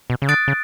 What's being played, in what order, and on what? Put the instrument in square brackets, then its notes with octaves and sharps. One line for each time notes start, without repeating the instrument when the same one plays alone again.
[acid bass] B2
C#3
[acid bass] D3 [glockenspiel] D#6 F#6 A6 D7
[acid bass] C#3